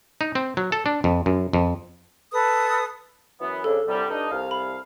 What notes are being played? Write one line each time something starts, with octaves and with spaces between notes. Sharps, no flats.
D#4
C4
F#3
A4
D4
F2
F#2
F2
A4 B4 D#6
F#2 E3 B3
F2 C#3 D4 A4
C2 D3 G3
G2 D4 D#4
C2 F5
B5